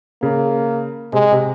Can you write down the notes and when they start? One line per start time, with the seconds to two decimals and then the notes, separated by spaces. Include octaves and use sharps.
0.22 C#3 A#3
1.13 C3 G#3
1.32 C3